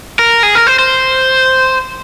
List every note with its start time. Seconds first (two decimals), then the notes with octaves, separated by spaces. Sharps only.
0.19 A#4
0.43 G#4
0.55 A#4
0.67 C5
0.79 C5